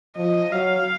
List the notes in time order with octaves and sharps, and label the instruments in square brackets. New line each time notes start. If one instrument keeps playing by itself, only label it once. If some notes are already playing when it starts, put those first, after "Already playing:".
[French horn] F3 [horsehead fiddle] D#5
[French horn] F#3 [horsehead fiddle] F5